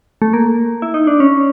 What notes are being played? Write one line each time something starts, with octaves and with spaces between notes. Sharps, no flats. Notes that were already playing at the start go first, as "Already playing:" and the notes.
A3
A#3
E4
D#4
D4
C#4